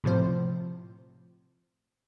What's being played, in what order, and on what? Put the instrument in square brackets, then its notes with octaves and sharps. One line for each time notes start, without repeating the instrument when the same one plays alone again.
[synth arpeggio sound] A2 C3 F3 C5